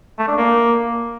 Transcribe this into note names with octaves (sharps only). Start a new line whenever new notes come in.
A3
D4
A#3